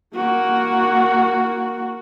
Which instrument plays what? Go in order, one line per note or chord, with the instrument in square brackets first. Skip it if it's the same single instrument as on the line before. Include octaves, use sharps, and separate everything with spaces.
[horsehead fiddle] A#3 F#4